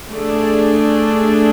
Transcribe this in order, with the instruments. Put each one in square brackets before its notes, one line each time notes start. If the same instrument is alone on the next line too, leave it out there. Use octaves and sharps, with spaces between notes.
[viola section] A3 D4 G#4